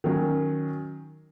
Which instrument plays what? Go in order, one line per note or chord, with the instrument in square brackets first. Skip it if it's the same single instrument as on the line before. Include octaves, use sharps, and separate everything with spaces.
[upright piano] D#3 F#3 C#4